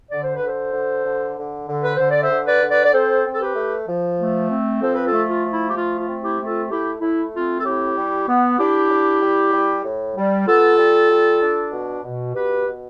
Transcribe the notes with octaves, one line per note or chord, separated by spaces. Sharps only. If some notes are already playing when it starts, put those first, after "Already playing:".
D3 D5
C5
B4
D3
A4 C5
D3
D3
D3
D3
B4
D3 C5
D5
C5 E5
D3
B4 D5
D3
B4 D5
D5
C4 A4 C5
C4
A4
G4 B4
A3
F3
A3
C4
F3 A4 C5
B4
F4 A4
A3
F4
F3
E4
G4
A3 F4
F4
C4
E4 G4
A3
F4 A4
A3 E4 G4
A3 E4
C4 F4
A4
A2 E4 G4
G3
B3
D4 E4 G4
D4
G3
G3
A2
G3
B3 F4 A4
G3
G3
D4
B2
B2
B2 G4 B4
B2